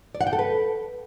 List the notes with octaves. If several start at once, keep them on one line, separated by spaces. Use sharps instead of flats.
D5
F#5
G5
A4
B4